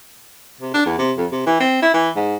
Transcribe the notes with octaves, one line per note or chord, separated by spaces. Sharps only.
C3
D4
E2
C3
F2
C3
E3
C4
E4
E3
G#2